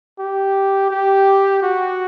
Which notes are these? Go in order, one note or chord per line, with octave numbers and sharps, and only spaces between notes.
G4
G4
F#4